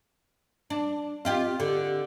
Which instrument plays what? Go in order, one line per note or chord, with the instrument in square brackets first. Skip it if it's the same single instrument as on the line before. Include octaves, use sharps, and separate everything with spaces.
[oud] D4
[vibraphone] C4 D#5 C6 [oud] F4 G4 F5
[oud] D3 [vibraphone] G4